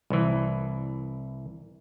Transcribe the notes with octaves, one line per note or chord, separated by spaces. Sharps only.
C2 E3